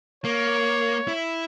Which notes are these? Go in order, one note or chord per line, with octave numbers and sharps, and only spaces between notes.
A#3 C#5
E4